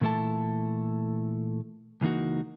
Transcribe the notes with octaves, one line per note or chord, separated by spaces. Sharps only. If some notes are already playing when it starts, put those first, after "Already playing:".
A#2 E3 A3 E4 A4 A5
C#2 E3 A#3 D#4 F#4